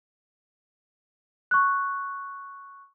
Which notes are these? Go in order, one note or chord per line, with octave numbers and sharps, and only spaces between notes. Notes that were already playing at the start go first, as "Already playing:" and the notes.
C#6 F#6